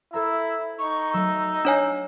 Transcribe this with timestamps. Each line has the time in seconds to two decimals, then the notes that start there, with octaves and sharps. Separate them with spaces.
0.14 E4 A4 C5 A#5 E6
0.79 D#4 C#6
1.14 F#3 A3 E6
1.65 D4 C#5 G#5